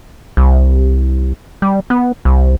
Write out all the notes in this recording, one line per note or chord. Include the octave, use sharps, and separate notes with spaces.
C2
G3
B3
C2